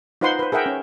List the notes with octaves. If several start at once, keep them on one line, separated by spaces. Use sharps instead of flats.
D#4 F4 B4 C5 F#5 C6
B4 C5
G#4 A#4 E5 F#5 G5
C#4